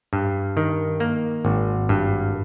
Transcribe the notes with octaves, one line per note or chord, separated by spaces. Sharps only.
G2
D#3
A#3
G#1
G2